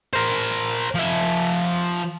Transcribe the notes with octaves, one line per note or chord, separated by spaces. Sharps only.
A#4 C5
F3 E5